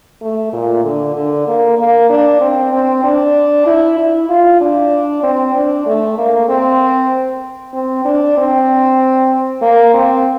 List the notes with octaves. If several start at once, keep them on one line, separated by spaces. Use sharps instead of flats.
A3
A#2
D3
D3
A#3
A#3
D4
C4
C4
D4
E4
E4
F4
D4
C4
D4
A3
A#3
C4
C4
D4
C4
A#3
C4